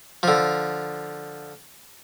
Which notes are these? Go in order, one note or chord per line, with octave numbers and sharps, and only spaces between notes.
D3 F3